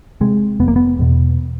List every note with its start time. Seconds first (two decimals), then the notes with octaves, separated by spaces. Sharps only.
0.21 C3 G#3
0.60 F1 B3
0.68 A#3
0.76 B3
0.99 E2 B2